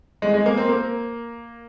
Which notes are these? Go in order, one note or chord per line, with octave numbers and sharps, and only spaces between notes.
G#3
G#3
A#3
C4
A#3